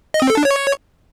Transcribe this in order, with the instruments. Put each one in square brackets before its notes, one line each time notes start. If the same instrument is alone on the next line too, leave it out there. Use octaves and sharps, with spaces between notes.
[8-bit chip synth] D#5
C4
A4
D4
C#5